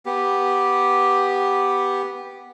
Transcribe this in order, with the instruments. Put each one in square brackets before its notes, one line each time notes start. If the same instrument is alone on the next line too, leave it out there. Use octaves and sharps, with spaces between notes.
[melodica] B3 G4